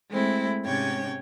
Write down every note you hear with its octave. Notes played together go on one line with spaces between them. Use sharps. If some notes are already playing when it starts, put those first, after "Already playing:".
G#3 A3 C4 E4
G#2 C3 C#4 C#5 G5 G#6